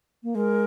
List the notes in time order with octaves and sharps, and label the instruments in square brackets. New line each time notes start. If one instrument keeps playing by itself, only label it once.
[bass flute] A#3
[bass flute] G#3 [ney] A#4